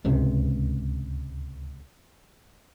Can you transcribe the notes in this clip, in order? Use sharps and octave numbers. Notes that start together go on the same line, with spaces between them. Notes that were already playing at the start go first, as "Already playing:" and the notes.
D1 C#2 G#2 C3